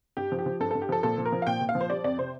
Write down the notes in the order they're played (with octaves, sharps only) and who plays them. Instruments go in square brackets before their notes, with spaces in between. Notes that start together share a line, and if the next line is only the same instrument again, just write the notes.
[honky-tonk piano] G2 G4
F3
G4
F3
G2 A4
A4
G2
G4
F3 A4
A#2 A4
F3
A#4
F3
F5
A#2 G5
A#2
F5
F3
C5
G3 D5
F2 D5
C3 C5